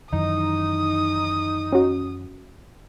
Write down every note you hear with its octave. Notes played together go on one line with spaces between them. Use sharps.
F#2 D#3 E3 D#4 D#6
C#4 F#4